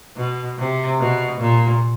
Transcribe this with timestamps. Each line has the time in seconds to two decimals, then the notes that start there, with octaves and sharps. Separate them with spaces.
0.17 B2
0.58 C3
1.00 B2
1.41 A#2